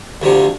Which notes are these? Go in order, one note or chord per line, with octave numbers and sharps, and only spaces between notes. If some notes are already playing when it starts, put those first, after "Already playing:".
D2 C3 F3